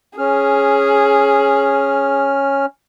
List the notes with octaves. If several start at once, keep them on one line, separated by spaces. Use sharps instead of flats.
C#4 G#4 F6